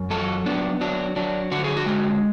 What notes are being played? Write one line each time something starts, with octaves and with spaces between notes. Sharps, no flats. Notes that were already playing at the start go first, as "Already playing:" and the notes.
Already playing: F#2
F#3 A4
B3 D4
F#3 D4
F#3 D4
D3 F#4
G#4
F#4
G#3